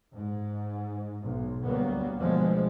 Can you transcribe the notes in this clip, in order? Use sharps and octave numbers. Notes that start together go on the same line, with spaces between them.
G#2
B1
D2 F#3 G3 A#3 B3
D2 B2 F3 G#3